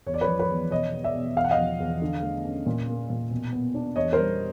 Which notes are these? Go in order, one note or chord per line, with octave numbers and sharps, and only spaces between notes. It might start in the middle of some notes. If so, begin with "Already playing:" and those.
E2 C#5
D5
B4 C#5
F3
B4 C#5
E2
B2 C#5 D#5
B3
D5 E5
B2
E2 F5
F#5
D#5 F5
F3
E2
D3
A3
C#4
A#2
A#3
A#2
B2
B3
D4
E2 C#5 D#5
A#4 C5
G3